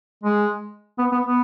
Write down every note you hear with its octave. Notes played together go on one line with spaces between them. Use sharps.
G#3
B3
B3
B3